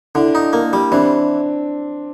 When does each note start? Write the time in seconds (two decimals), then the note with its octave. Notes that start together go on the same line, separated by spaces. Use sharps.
0.15 D3 D4 E4
0.35 D#4
0.53 A#3
0.73 G3
0.92 E3 C4 D4